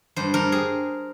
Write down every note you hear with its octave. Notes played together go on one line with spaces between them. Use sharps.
G2 C5
G2 A#4
G#4